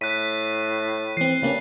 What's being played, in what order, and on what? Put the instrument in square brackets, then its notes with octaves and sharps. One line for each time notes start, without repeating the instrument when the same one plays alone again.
[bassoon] A2 [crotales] F#6 D#7 [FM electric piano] B6
[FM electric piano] E3 C4 [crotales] C7
[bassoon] G2 [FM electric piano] C#3 A#3 C#4